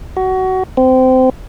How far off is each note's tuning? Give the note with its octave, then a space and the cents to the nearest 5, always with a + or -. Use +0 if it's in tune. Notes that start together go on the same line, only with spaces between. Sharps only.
F#4 +20
C4 -20